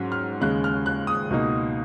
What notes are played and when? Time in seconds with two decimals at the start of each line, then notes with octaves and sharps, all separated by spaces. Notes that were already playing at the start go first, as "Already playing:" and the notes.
Already playing: G#2 F#3 C#4
0.12 F6
0.41 D#2 C#3 G#3 F#6
0.64 F6
0.86 F#6
1.07 D#6
1.30 C#2 B2 A#3 D#4